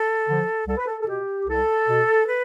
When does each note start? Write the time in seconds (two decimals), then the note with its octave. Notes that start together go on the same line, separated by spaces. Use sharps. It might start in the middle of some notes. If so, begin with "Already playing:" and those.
Already playing: A4
0.27 D3 F3
0.67 C2 A4
0.77 B4
0.87 A4
1.01 A4
1.07 B2 G4
1.47 C2 A4
1.87 B2
2.27 B4